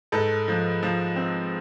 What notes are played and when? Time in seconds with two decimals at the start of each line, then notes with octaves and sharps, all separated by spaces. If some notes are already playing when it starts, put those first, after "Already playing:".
0.12 G#2 A4 B4
0.48 F3
0.83 F3
1.16 C4